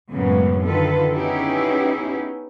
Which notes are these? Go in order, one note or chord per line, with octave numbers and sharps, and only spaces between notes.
F#2 A2 C#3 G#3 A#3 B3
D3 D#3 F4 A4 B4
B3 C#4 D#4 E4 G4 G#4